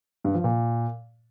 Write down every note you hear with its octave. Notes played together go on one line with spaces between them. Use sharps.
G2
F3
A#2